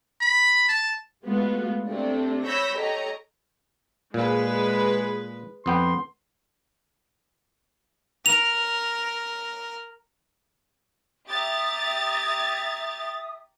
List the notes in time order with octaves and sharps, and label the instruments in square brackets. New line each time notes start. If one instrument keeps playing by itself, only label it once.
[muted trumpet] B5
A5
[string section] G#3 A3 B3 F4 F#4
C3 A3 C4 D4
C#5 B5 E6 G6 A#6 B6
G4 A4 C#5 D#5 A#5
[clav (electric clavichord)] A#2 [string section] G#3 B4 [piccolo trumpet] G#4
[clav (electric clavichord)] F2 B3 G5 [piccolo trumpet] C6
[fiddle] A#4 [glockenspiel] F7
[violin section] G4 A#5 [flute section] E5 D#6 [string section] A6